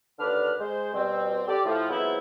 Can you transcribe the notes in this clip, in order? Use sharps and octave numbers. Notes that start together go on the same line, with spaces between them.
D#2 D3 D4 B4 D5 F6
G#3 C5
B2 G3 C4
G4 A4 D5
A2 F3
F3 F#3 G#3 B3 C4 E4